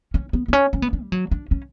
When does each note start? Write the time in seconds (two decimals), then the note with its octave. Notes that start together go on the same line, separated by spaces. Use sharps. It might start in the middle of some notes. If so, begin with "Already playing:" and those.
0.14 C#4
0.33 B3
0.48 B3
0.53 C#4
0.73 C#4
0.82 B3
0.93 D4
1.02 G3
1.12 F#3
1.31 D4
1.51 C#4